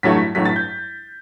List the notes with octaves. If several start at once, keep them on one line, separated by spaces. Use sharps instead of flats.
A1 G2 F#3 A3 B6
A1 G2 F#3 A3 B6
A6
G6